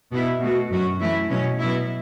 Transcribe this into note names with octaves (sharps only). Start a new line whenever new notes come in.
B2 B3 E4
B2 A3 F#4
F#2 F#3 C#4 F#4
E3 A3 E4
B2 F#3 C#4
B2 F#3 B3 E4